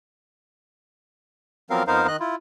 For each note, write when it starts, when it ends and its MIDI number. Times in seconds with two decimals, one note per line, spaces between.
1.70 1.83 53
1.70 1.83 54
1.70 1.83 59
1.70 1.83 60
1.70 1.83 70
1.70 1.83 77
1.87 2.07 41
1.87 2.07 59
1.87 2.07 63
1.87 2.07 70
1.87 2.07 72
1.87 2.07 77
2.08 2.16 51
2.08 2.16 75
2.08 2.16 90
2.20 2.35 64
2.20 2.35 65